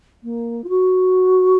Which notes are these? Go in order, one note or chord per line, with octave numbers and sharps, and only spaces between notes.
A#3
F4
F#4